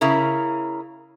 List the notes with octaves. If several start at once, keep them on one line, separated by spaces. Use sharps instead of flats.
C#3 E4 A#4